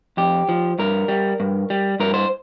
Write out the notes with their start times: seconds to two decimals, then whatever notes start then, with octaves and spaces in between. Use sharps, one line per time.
0.17 F2 G4
0.49 F3
0.79 G2 A#4
1.08 G3
1.40 G2
1.70 G3
2.00 G2 A#4
2.14 C5